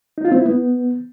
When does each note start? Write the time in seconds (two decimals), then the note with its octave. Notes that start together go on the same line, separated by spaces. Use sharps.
0.18 D#4
0.25 F4
0.32 C4
0.39 E4
0.46 B3